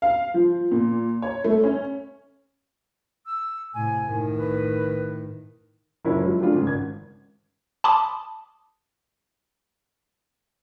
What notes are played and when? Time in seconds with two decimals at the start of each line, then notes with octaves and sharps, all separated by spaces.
0.02 F5
0.34 F3
0.71 A#2
1.22 C#5
1.44 A3
1.64 C#4
3.26 E6
3.74 A2 C3 G#5
4.06 A2 D#3
4.36 B4
6.05 F#1 A#2 F#3 E4 C#5 B5
6.23 F3 F#3 G#3
6.41 A3 C4 D4 F4
6.53 G#2 C#3
6.66 G#1 G#6
7.84 A5 B5 C6 D6 D#6